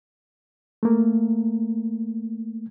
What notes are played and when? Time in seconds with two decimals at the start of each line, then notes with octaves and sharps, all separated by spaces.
0.83 A3 A#3